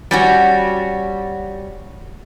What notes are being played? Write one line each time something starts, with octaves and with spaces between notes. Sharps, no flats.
G3 C#4 F#4